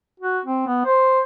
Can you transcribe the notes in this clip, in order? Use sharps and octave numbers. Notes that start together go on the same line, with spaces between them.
F#4
C4
B3
C5